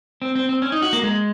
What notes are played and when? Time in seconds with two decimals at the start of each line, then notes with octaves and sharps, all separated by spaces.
0.22 C4
0.35 C4
0.49 C4
0.62 C#4
0.72 D#4
0.82 F#4
0.93 A#3
1.03 G#3